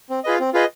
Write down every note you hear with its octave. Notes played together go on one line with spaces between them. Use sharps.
C4
F4 G#4 B4 D#5
C4
F4 G#4 B4 D#5